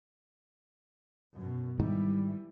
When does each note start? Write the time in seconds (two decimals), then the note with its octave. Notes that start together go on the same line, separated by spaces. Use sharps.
1.36 F#2 B2
1.80 G#2 D#3 E3 G3